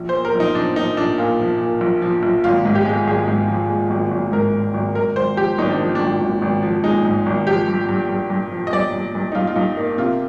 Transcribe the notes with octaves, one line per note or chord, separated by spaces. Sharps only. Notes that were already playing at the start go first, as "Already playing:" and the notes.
Already playing: A#1
C5
A#2
A#4
A#1 D#4
F3 D4
F3 D#4
A#1 D4
A#2 F4
F3
A#2
A#1
F3
A#1
G#1 F4
G#2
G4
G#3
G#1 G#4
G#2
F3
G#3
G#1
G#1
G#2 A#4
G#2
G#1
G#1 A#4
G#1 C5
F3 G4
G#1 D#4
D4
F3
D4
G#1
G#1
G#1
F3
G#3 D#4
G#2
G#1
F3 G4
G2
G2
G2
G2
F3
D#5
G2 D5
G2
G2
D#4
G2 F4
F4
G2 D#4
A#3 D#4
C3 F4